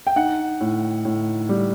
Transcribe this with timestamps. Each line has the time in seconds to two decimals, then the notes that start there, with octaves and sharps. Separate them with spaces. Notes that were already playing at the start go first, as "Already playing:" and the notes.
0.07 G5
0.16 D#4 F#5
0.60 A2
1.05 A2
1.49 G3